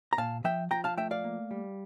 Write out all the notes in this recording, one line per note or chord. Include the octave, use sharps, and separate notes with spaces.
A#5
A#2 F5 A5
F3 E5 G5
F3 G5 A#5
F5 A5
A3 E5 G5
D5 F5
A#3
G3